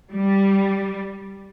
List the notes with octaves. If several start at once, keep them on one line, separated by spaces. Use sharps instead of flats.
G3